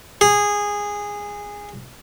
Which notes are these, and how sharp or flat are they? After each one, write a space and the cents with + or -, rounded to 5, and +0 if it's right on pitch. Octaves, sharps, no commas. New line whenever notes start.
G#4 -15